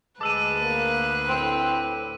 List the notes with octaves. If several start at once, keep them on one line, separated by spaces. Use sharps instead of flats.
D2 G#3 B4 A5 D6 E6 F#6 D#7
A#3
A2 C4